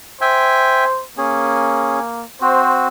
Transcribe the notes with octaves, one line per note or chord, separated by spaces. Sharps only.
C5 E5 G5 G#5
A#3 C#4 G#4
C4 F#4 C5